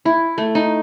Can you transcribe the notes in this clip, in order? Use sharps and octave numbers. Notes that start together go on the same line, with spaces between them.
E4
A3
D#4